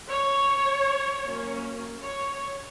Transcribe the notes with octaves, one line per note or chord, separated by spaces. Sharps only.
C#5
F#3 A#3 C#4
C#5